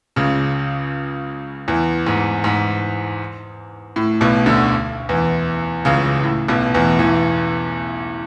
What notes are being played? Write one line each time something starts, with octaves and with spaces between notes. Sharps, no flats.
C#2 C#3
E2 E3
G#2
G#2
A2
B1 B2
D2 D3
E2 E3
C#2 C#3
A2
B1 B2
E2 E3
E2 E3